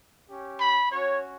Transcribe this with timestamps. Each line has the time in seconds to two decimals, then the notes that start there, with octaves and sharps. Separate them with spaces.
0.30 C#4 G4
0.61 B5
0.92 C#4 F#4 C#5